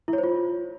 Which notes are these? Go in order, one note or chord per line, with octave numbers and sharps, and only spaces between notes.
E4
C#5
C5
F4